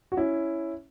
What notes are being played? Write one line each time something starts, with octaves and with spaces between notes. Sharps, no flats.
F#4
C#4 E4